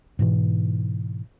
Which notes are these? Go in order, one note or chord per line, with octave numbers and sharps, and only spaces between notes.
G#2 B2 E3